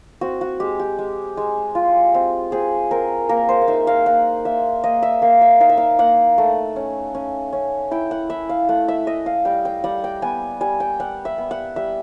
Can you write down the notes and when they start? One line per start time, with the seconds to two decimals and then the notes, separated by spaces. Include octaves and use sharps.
0.21 C4 F#4
0.41 F#4
0.60 G#3 G4
0.80 G4
0.99 G#3
1.37 G#3
1.75 F4
2.14 C4
2.52 C4 G#4
2.91 C4 A#4
3.29 A#3 A#4
3.49 C5
3.62 F5
3.68 D#4 E5
3.87 F5
4.06 A#3 F#5
4.45 A#3 E5
4.84 A#3 D#5
5.02 E5
5.22 A#3 F5
5.41 E5
5.60 D#4 F5
5.69 E5
5.77 F5
5.99 A#3 F#5
6.38 A3
6.76 C#4
7.14 C#4
7.53 C#4
7.91 E4 G5
8.11 F#5
8.30 E4 E5
8.49 F5
8.69 A3 F#5
8.88 E5
9.07 A3 D#5
9.26 F5
9.45 G3 G5
9.65 G5
9.84 G3 F#5
10.04 G5
10.22 B3 G#5
10.61 G3 G#5
10.80 G5
11.00 G3 F#5
11.25 E5
11.38 B3
11.51 F#5
11.76 G3 E5